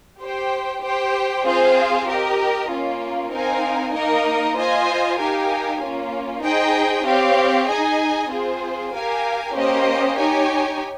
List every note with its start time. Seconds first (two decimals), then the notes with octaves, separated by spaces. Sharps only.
0.21 G4 C5 G5
0.83 G4 C5 G5
1.46 C4 F4 G#4 C5 F5
2.07 G4 A#4 D#5
2.70 A#3 C#4 F4
3.32 C4 D#4 A#4 F5 G#5
3.94 A#3 D#4 A#4 D#5
4.57 F4 C5 D#5 G#5
5.19 D#4 G4 A#4 F5 G#5
5.81 A#3 C#4 F4
6.44 D#4 G#4 C5 D#5 G5
7.06 C4 G4 C#5 F5
7.68 D#4 G#4 D#5 G#5
8.30 C4 F4 G#4 C5
8.92 G4 A#4 F5 G#5
9.56 A#3 C#4 G4 C5 D#5
10.18 D#4 G4 C#5 G#5